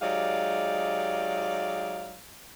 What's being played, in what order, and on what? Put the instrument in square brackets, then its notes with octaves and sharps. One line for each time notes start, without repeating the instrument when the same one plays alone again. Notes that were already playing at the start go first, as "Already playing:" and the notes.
[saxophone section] F#3 G#3 D#4 G4 D5 F5